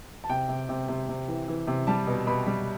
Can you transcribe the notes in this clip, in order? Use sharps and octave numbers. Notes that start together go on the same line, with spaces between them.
A5
C3 G5
C3
C3
C3
C3
E3
E3
C3
G3 A5
B2
B2 B5
G3